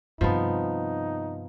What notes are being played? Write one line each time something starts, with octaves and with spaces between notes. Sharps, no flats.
G2 C3 F3 B3 D#4